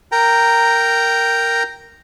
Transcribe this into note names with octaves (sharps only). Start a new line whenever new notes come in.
A#4 G5 A#5